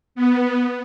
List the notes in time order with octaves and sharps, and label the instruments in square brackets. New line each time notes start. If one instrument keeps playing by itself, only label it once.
[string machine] B3